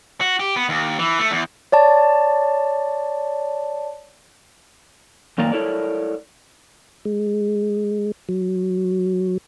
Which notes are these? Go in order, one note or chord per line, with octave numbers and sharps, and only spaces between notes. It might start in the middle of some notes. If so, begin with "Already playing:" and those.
F#4
G4
B3
D#2
E3
A3
E2
C#5 D5 A5
F#2 D#3 A#3 A#4 D5 A#5
E4 A4 A#4 C#5 D5
G#3
F#3